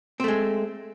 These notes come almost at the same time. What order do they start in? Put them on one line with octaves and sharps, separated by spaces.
C4 A3 G#3